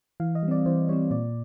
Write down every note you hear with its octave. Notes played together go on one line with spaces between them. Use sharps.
E3 F5
D#5
G3
C4 D5
E3 C5
G3 C4 C#5
A#2 D5